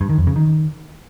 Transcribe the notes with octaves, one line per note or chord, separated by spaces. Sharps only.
G2
D#3
F2
C#3
D#3